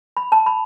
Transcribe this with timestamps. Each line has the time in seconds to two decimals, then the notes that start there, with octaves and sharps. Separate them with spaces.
0.17 B5
0.32 A5
0.46 B5